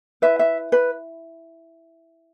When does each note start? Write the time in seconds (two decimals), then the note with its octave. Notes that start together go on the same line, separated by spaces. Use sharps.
0.22 E4 B4 E5
0.39 E5
0.72 B4